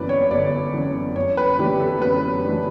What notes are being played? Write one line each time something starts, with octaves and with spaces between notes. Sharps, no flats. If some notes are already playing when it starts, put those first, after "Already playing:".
Already playing: G1 F#2 E3 B4 D5
C#5
G1 D5
F#2 E3
F#2 C#5
B4
E3 A3 D4 G4
A4
F#2 B4
E3 A3 D4